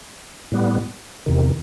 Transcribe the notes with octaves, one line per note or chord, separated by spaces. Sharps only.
A2 G3 B3
E2 C3 D#3